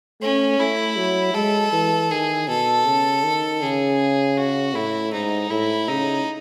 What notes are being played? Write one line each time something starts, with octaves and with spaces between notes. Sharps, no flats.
A3 C#4
A3 E4
F#3
G#3 A4
E3
D#3 G#4
B2 A4
C#3
D#3
C#3 G#4
F#4
A2 E4
G#2 D#4
A2 E4
C#3 D#4